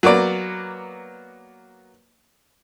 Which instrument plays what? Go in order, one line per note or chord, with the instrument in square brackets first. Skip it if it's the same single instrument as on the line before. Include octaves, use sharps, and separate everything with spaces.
[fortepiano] F#3 A#3 B3 D5